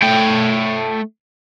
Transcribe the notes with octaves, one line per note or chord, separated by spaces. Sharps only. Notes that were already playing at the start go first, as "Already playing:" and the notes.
A3 G5